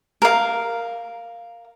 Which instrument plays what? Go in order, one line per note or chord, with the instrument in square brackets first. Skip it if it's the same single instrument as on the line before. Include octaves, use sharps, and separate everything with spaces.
[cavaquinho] A#4 F5